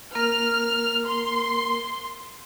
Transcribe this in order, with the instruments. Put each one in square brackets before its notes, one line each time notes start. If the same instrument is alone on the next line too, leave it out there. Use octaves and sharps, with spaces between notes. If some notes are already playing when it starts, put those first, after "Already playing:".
[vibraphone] A#3 A#4 [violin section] F6
[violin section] C6